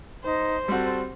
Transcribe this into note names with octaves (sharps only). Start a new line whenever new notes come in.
D#4 C5
G3 C4 F#4 A4